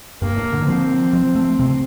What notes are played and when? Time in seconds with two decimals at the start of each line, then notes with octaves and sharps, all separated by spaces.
0.22 G2 A#3
0.36 A2
0.52 D3
0.61 D#3
0.68 F3 C4
1.13 F3
1.35 A3
1.59 C3